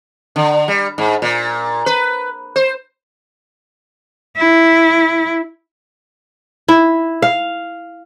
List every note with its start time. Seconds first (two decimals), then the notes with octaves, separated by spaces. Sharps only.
0.36 D3
0.68 G3
0.98 G#2
1.22 A#2
1.86 B4
2.56 C5
4.37 E4
6.68 E4
7.22 F5